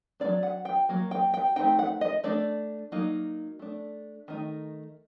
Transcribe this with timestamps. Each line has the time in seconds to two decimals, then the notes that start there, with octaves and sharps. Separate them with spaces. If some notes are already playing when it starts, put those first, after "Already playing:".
0.20 A#3 D4 D5
0.25 F#3
0.43 F#5
0.65 G5
0.89 F#3 A#3
1.11 G5
1.34 G5
1.56 A3 C4 D#4 G5
1.79 F#5
2.01 D#5
2.24 A3 D4 D5
2.92 F#3 A#3 D#4
3.59 A3 D4
4.28 D#3 A3 D#4